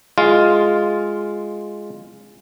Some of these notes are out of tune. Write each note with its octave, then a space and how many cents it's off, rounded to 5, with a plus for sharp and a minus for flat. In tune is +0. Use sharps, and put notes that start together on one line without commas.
G#3 +0 F4 +0